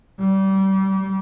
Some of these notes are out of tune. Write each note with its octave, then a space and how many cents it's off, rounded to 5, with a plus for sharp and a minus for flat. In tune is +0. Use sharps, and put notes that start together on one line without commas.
G3 -30